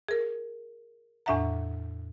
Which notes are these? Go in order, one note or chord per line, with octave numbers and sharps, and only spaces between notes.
G#4 A#4
E2 A2 D4 E5 F#5 A#5